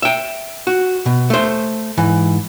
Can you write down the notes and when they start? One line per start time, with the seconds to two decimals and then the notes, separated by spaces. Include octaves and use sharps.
0.02 E5 G5
0.67 F#4
1.06 B2
1.30 A3 C5
1.97 G#2 E3